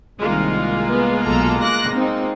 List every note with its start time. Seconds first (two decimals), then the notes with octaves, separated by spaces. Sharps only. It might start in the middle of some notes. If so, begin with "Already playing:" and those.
0.19 C2 D#3 G#3 A#3 F4
0.89 B3
1.23 B1 A4 A#5
1.62 D6 F#6 A#6
1.92 C4 D#4